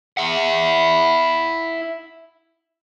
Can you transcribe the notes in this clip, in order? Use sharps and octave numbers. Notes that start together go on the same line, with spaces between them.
E4 F#5